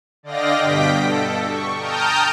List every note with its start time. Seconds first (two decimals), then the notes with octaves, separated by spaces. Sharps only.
0.23 D3 D5 D#5 F5 G5 A#6
0.62 G2 B2 G5 B6 D7
0.99 A4
1.46 C#6
1.77 G5 A5 A#5 D#6 F6 G6